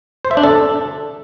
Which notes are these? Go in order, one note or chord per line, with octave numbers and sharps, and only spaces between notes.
C5
E5
D4
A4